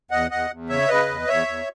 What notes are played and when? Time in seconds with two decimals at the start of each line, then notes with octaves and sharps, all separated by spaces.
0.11 E2 D#5 F#5
0.30 E2 D#5 F#5
0.50 E2
0.69 C#3 C#5 E5
0.88 C#3 B4 D#5
1.08 E2
1.28 E2 C#5 E5
1.47 E2